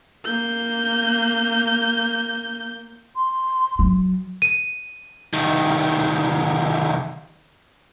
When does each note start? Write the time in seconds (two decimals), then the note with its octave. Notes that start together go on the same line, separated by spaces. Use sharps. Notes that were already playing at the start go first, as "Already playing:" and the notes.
0.25 A#3 G6
3.16 C6
3.79 F#3
4.42 D#7
5.33 C2 D#3